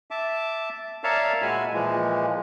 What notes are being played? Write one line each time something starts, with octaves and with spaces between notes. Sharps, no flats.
E5 A5 D6
A#4 C#5 D5 E5 F5 A5
A#2 G#3 F#4 E5 G#5 B5
A#2 E3 F3 G#3